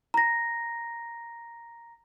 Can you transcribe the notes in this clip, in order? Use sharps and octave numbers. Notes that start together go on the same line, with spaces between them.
A#5 A#6